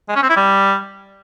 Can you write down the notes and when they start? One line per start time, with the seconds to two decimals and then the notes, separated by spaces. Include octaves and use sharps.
0.09 G#3
0.16 C#4
0.23 C4
0.29 E4
0.36 G3